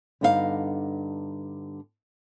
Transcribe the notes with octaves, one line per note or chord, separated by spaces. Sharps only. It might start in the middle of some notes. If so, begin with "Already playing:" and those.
G2 D3 B3 D#4 F4 F5